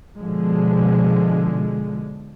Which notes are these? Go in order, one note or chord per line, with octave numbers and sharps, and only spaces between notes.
B2 D3 F3 G#3